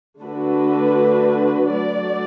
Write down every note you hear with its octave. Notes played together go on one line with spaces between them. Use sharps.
D3 A3 D4 F#4 B4
F#3 A3 F#4 D5